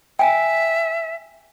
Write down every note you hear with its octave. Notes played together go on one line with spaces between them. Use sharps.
E5 G5 G#5